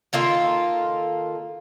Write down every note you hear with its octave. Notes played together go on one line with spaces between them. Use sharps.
D#3 A#3 F4 A4